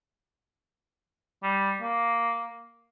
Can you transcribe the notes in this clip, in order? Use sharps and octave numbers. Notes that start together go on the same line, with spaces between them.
G3
A#3